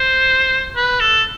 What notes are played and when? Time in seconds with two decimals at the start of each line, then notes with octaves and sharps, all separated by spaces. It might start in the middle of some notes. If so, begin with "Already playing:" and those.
Already playing: C5
0.76 B4
1.00 A4